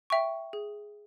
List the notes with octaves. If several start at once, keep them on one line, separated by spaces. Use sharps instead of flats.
E5 G5 C#6
G#4